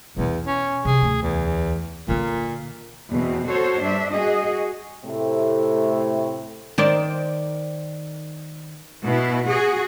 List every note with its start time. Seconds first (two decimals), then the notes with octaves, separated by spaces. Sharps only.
0.17 E2 B2 B3
0.47 C#4
0.85 C3 G#4
1.02 D2 A3
1.22 E2
2.08 A#2 D3 D#3
3.11 E2 B2 C4
3.49 F#4 A4 C5 C#5
3.81 G2 D4 E5
4.13 F#4 G#4 D#5
5.04 A2 C3 A3
6.78 D#3 C5 D5
9.06 B2 E4
9.47 F#4 G#4